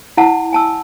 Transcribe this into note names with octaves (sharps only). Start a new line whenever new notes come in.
E4 F#5 A5
G#5 A5 E6